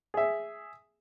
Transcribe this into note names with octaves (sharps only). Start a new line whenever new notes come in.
G#4 E5